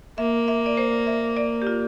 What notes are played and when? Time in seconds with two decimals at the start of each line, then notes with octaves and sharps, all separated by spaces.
0.18 A#3 E5
0.48 E5
0.66 D5
0.77 C5
1.07 E5
1.37 D5
1.62 G4
1.67 F4